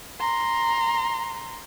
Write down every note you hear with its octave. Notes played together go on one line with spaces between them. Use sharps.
A#5 C6